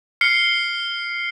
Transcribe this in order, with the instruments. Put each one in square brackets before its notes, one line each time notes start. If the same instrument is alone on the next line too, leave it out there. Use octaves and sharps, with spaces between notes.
[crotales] F6 C7 C#7 G7